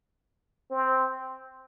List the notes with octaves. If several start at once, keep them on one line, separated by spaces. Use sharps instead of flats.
C4